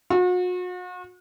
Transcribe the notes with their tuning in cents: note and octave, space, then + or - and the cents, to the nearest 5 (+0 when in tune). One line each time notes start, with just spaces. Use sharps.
F#4 -40